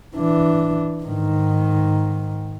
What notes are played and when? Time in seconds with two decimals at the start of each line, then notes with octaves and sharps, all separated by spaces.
0.16 E3 D4
1.04 G#2 D#3